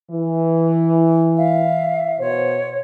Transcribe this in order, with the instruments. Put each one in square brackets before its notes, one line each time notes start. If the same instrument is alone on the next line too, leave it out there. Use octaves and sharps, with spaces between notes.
[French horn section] E3
[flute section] E5 F5
[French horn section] B2 C5 [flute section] C#5